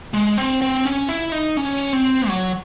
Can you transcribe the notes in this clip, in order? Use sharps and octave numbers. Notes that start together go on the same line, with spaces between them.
G#3
C4
C4
C#4
E4
D#4
C#4
C4
F#3